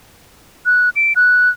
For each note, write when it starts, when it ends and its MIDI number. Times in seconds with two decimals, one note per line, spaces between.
0.66 0.90 90
0.96 1.13 98
1.16 1.50 90